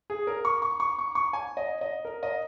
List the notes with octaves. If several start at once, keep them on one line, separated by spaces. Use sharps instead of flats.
G#4
A#4
C#6
C#6
C#6
C#6
C#6
G#5
D#5
D#5
A#4
D#5